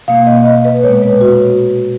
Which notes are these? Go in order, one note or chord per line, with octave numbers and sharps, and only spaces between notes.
B2 A#3 F5
D#5
D#5
B4
A#2 G#3 B3 C#5
B4
F#4